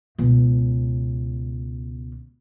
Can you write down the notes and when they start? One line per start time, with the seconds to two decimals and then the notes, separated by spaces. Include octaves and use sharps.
0.18 C#2 B2